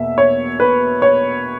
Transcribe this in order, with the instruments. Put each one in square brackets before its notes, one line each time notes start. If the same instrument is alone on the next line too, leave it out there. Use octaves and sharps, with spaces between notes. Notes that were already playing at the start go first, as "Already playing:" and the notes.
Already playing: [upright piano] E2 B2 A#3 E5
C#5
B4
C#5